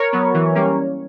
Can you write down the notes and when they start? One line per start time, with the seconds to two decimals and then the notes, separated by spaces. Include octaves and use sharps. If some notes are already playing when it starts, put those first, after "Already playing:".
Already playing: A#4 C#5
0.13 F#3 B3
0.34 E3
0.55 G3 A#3 C#4